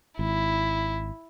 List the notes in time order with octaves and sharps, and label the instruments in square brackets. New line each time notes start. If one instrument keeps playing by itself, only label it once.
[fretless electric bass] G#1 [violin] E4